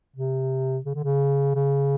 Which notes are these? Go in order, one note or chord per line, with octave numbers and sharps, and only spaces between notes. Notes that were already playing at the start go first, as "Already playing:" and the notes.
C3
C#3
D3
C#3
C#3